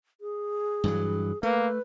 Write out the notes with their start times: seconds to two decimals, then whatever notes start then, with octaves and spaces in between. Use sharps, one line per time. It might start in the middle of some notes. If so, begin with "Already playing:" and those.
0.21 G#4
0.84 G2 E3 F#3
1.43 A3 A#3 B4